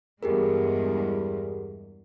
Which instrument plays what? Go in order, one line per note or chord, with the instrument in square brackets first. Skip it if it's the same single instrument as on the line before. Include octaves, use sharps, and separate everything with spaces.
[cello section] E2 G2 G#3 [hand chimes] G4 G#4 A#4